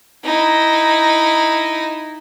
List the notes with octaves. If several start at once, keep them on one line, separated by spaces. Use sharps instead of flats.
D#4 E4